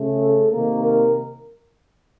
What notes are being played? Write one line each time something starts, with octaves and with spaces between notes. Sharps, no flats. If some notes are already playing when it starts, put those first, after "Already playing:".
Already playing: C#3 A3
A4
C3 D#3 A#3 A#4
A#4